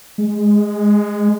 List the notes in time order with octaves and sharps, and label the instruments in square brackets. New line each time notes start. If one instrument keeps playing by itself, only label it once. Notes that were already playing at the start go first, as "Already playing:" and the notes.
[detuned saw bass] G#3